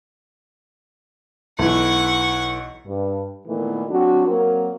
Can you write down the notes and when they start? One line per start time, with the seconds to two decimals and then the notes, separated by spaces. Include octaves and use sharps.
1.59 B1 E3 F#5 C#6
2.86 G2
3.47 A#2 D#3 E3 A3 B3
3.91 F#3 C4 D4 F#4
4.27 F#3 A#3 C4 A#4